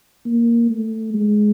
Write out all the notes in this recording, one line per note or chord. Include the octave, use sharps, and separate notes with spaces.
A#3
A3
G#3